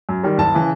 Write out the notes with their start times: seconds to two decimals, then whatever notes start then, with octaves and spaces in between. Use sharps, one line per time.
0.09 F#2
0.23 D#3 G3
0.38 F#1 A5
0.54 C#3 E3